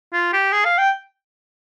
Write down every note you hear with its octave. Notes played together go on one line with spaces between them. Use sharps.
F4
G4
G#4
F5
G5